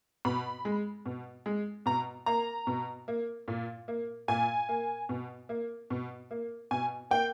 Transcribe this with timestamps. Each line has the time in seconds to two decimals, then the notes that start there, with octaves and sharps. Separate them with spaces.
0.25 B2 B5
0.65 G#3
1.06 B2
1.46 G#3
1.86 B2 A#5
2.26 A#3 A#5
2.67 B2
3.08 A#3
3.48 A#2
3.88 A#3
4.28 A#2 G#5
4.69 A#3
5.09 B2
5.49 A#3
5.90 B2
6.31 A#3
6.71 B2 G#5
7.11 A#3 G5